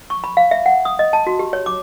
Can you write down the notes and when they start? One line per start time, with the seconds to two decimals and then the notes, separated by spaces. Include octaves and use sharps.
0.10 C#6
0.24 B5
0.37 F5
0.51 E5
0.66 F#5
0.85 D#6
0.99 D#5
1.13 A5
1.27 F#4
1.39 G4
1.53 C#5
1.66 D6